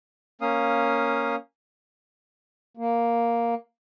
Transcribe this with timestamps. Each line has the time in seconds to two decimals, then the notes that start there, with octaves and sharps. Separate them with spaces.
0.41 A#3 C#4 F5 D#6
2.77 A#3